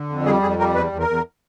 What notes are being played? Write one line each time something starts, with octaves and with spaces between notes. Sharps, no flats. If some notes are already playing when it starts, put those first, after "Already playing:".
Already playing: D3
F2
G3 G#4
F2 G#4
G3 A#4
E2 B4
E2
A#4
E2